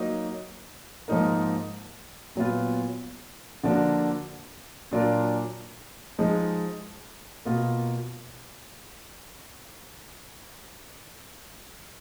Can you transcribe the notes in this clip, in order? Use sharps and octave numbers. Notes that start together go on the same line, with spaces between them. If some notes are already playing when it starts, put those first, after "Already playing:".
Already playing: F#3 A#3 D#4
G#2 F3 A#3 D#4 A#4
A#2 F#3 B3 F4
D3 F3 A#3 D4 F#4
A#2 F#3 D4 F4 A#4
F3 G#3 D#4 G#4
B2 A#3 F4